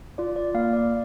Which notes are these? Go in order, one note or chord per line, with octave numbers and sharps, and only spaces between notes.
F4 D5
D5
A#3 F5
D5